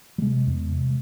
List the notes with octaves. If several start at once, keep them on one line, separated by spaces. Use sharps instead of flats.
G3
C3 G#3
E2
C3